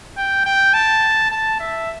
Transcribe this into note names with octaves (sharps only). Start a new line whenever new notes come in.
G5
G5
A5
A5
E5